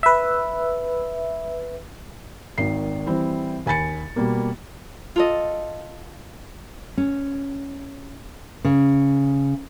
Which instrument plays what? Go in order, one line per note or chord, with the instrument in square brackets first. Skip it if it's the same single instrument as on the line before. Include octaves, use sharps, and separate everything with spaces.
[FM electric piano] B4 E5
[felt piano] G#1 D#3 C7
E3 G3 C4
D#2 G#5 B5 A6 C#7
B2 G3 A#3
[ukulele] F4 A4 D#5
[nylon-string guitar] C#4
C#3